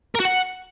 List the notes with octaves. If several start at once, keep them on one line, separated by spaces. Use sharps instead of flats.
A#4
F#4
F#5